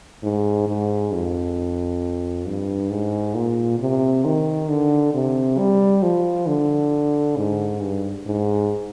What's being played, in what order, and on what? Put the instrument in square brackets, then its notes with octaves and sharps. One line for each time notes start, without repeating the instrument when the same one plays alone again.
[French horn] G#2
G#2
F2
G2
G#2
A#2
C3
D#3
D3
C3
G3
F3
D3
G#2
G2
G#2